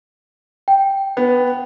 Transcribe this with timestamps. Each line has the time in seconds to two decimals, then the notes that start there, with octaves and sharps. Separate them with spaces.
0.68 G5
1.17 B3